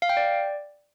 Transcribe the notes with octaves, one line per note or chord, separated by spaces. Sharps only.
F5
G5
D5